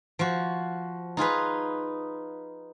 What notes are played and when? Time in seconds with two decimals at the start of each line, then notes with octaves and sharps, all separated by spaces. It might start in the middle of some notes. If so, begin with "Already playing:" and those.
0.19 F3 F#4
1.17 D#4 F4 G#4 B4